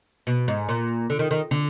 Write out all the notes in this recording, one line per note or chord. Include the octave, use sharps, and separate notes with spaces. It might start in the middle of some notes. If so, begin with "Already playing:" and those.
B2
G#2
A#2
D3
D#3
D#3
D3